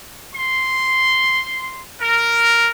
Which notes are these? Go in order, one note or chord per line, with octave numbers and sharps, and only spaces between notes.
C6
A#4